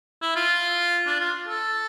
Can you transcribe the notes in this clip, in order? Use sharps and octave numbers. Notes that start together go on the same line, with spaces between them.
E4
F4
D4
F4
A4